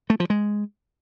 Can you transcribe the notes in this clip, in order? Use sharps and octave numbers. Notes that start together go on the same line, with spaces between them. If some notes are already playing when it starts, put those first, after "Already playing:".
A3
F3
G#3